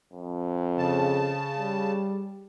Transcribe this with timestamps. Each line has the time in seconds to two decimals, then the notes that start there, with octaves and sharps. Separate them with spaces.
0.13 F2
0.78 C#3 A5
1.58 G3